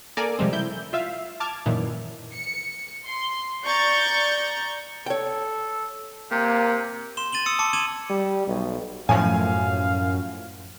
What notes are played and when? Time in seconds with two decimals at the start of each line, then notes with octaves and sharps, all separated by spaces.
0.17 A#3 A4 A#4 D5 G#5 D6
0.39 C3 F3 G3 G#3 C4
0.53 E4 G6
0.93 F4 E5 F5
1.40 A5 D6 F6 G#6
1.66 F#2 A#2 D#3 E3
2.33 C#7
3.06 C6
3.65 D5 A#5 C#6 G6 A6
5.06 A4 C#5 G5
6.31 C3 A#3
7.17 C6 E7 G7
7.32 A6 D#7 F#7 G7
7.46 D#6 E6 C#7
7.59 A5 D6 C#7
7.73 D6 G#6 D#7 E7 F#7 G7
8.10 G3
8.47 B1
9.09 F#2 A2 F3 F5 G#5